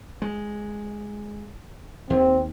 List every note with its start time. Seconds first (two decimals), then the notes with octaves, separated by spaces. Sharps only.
0.22 G#3
2.10 D#2 C4